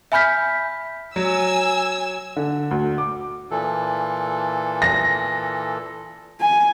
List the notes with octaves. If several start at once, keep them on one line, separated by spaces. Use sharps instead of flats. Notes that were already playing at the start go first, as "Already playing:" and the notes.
E5 G#5 B5 F6 G6 B6
F#3 G#5 E6
D3
D2
D6
A#2 E3 A4
A#6
G#5